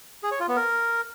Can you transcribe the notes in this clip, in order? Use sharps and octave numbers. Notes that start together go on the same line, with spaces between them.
G#4
C#5
F4
B3
A#4